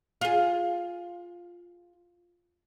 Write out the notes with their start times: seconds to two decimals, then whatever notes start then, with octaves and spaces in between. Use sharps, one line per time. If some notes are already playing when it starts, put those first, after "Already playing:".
0.21 F4 G#4